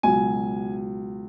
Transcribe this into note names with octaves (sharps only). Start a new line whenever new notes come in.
C#2 B2 F#3 G#5